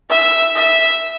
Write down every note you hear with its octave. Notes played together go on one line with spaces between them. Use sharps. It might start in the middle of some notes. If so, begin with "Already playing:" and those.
E5
E5